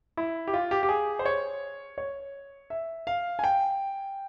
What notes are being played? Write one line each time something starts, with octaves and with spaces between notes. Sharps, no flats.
E4
G4
F4
G4
G4
G#4
C5
C#5
C#5
E5
F5
G#5
G5